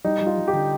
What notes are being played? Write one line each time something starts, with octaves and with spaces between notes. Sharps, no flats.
G3 D#4
G3
F4
G3
G4
D3